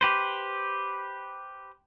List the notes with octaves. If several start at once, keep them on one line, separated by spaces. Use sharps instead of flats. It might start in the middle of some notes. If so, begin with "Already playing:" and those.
G4 B4 C5